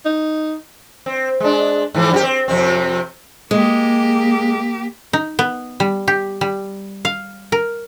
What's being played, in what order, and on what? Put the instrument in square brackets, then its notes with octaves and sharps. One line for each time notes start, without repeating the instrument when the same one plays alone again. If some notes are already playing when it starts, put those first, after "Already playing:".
[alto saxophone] D#4
[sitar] C4
G#3 D4
G#2 E3 F3
F#2 F#4 G4
C4
F2 C3 C4
[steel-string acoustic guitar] G#3 [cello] A#3 G4
[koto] D#4
B3
G3
G4
G3
F5
A#4